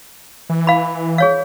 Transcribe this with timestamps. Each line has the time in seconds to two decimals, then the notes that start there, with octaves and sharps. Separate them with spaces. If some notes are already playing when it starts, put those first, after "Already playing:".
0.49 E3
0.67 F5 B5
1.18 G#4 C#5 F5